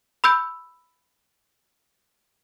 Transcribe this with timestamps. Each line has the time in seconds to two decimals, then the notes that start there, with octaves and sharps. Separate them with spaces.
0.24 B5 E6 G6